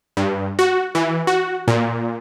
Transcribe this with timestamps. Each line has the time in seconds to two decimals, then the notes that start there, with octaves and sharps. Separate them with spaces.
0.17 G2
0.59 F#4
0.95 E3
1.27 F#4
1.68 A#2